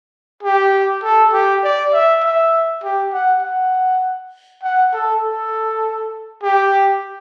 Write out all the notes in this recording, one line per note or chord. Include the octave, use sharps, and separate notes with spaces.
G4
A4
G4
D5
E5
E5
G4
F#5
F#5
F#5
A4
A4
G4